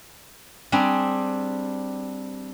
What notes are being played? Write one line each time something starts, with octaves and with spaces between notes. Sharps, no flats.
G3 C4 D4 G#4